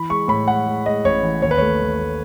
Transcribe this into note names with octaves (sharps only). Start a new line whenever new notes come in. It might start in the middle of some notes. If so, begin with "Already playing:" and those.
Already playing: E3 B5
G#3 C#6
A2 B5
G#3 F#5
G#3
G#3 D#5
A1 C#5
E3
D#2 C#5
B4
A3 C#5
D#2
A3